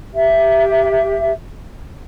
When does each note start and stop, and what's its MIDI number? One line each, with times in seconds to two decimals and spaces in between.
0.14 1.30 67
0.14 1.30 76